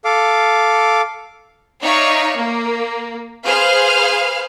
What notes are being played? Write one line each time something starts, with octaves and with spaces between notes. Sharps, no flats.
A4 F5 D6
D#4 C#5 D5 E5 F5 C#6
A#3
G#4 B4 C5 F5 F6